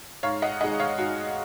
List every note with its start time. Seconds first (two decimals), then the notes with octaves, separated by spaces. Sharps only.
0.23 G#2 C#5 F5
0.42 D#5 F#5
0.61 D#3 G#3 D#5 F#5
0.80 C#5 F5
0.98 G#2 F#4